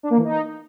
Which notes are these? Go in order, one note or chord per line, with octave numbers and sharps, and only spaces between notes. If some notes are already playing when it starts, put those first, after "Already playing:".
D4
A#3
E3
D#4